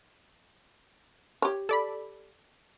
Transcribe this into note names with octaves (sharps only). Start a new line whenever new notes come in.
G4 C#5
A4 D5 B5